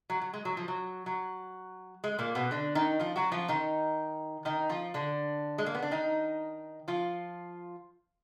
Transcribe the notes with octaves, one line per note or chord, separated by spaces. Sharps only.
F#3
F#3
G#3
F#3
F3
F#3
F#3
G#3
A#2 A#3
B2 B3
D3 D4
D#3 D#4
F3 F4
F#3 F#4
F3 F4
D#3 D#4
D#3 D#4
F3 F4
D3 D4
G#3
A#3
B3
D4
D#3 D#4
F3 F4